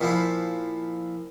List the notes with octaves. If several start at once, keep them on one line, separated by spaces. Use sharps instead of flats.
A#2 F3 E4